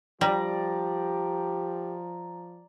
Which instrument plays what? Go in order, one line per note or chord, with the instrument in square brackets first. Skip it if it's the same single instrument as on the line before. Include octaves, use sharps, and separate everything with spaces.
[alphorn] F3 [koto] G3 [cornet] G4 [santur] D5 A#5